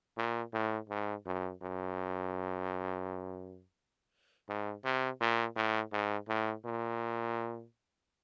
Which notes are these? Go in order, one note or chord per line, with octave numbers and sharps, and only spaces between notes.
A#2
A2
G#2
F#2
F#2
G#2
C3
A#2
A2
G#2
A2
A#2